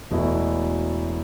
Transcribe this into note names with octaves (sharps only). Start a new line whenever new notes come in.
E1 E2 B2 A3 E4